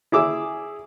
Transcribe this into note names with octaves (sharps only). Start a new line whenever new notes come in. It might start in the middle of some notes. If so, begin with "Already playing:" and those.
E4 G#4 D6 E6